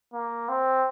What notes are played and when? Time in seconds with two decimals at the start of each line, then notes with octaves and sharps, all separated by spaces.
0.13 A#3
0.49 C4